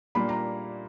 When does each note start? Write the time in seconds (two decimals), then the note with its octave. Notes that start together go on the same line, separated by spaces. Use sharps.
0.15 A#2 G3 A#3 D4 B5
0.29 A#5